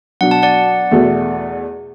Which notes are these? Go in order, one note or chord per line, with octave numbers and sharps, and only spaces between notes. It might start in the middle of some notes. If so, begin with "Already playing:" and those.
B2 F#3 D4 F#4 F#5
A5
D5 F#5
E2 B2 A3 F#4